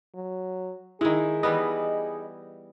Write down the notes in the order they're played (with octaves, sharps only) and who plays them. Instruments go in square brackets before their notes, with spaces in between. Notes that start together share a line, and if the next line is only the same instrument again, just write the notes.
[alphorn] F#3
[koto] D#3 G#3 [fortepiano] D#4 E4 [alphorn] G#4
[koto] E3 G3 B3 [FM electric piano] D#5